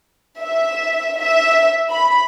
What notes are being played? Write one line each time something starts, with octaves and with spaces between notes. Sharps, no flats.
E5
E5
B5